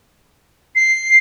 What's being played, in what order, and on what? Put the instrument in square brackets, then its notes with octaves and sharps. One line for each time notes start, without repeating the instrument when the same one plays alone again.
[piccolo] C7